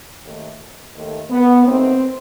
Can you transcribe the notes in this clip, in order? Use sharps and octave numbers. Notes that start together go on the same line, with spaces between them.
D#2 D#3 A3
D#2 D#3 A3
B3
D#2 D#3 A3 C4